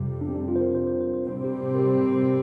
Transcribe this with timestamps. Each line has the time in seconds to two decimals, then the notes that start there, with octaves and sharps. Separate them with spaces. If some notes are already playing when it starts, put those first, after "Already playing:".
Already playing: F2 C3 G3
0.21 D4
0.28 C4
0.35 D4
0.48 F4
0.56 C5
0.61 A#4
0.75 C5
0.87 C5
1.01 C5
1.14 C5
1.27 C3 G3 C4 C5
1.44 G4
1.61 G4
1.75 A#4
1.79 G4